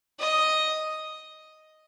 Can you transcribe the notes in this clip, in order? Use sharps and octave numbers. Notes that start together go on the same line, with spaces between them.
D#5